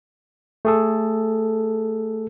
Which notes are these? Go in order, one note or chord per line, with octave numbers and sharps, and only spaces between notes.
A3 G#4 A4